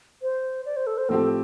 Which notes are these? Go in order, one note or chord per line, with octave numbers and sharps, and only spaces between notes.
C5
D5
C5
A4
C5
A2 F3 C4 G4 A4